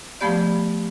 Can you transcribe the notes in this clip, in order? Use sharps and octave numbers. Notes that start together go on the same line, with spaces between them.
F3 A3 B3 G4 D5